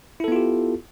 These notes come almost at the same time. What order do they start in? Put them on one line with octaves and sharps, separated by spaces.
E4 A4 B3 F4 G4